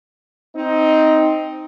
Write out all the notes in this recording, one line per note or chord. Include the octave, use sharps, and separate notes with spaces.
C4 D#4